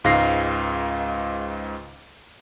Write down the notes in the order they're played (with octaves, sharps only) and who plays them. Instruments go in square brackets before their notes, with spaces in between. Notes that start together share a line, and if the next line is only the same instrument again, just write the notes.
[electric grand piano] C#2 G#2 F5 A#6 C7